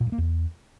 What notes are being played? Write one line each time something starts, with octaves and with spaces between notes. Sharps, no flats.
A#2
G2
A#3
E2